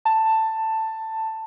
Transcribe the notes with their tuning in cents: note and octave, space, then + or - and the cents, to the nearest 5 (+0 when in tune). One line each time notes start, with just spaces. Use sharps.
A5 +10